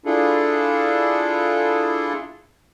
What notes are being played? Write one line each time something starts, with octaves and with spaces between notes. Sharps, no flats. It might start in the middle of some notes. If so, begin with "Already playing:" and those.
D4 E4 F4 G#4 A4